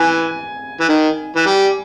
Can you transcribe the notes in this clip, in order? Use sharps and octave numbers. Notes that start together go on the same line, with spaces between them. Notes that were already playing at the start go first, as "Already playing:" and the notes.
Already playing: E3 G#5
E3
D#3
E3
G3